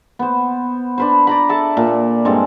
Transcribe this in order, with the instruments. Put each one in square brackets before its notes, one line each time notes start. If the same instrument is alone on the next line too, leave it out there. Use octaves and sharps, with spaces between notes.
[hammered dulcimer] B3 C5
D4 B4 C5
D5 A#5 B5
A4 D5 E5 A5
A#2
G2 G#3 C4 A4